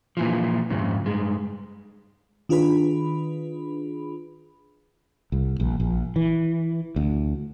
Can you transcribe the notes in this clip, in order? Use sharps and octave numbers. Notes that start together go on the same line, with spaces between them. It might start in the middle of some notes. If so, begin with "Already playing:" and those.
A#2 E3 F3
F2 G#2 C#3
G2 G#3
D#3 D4 F4 G#4 B4 B5
C2
A#1
A#1
E3
D2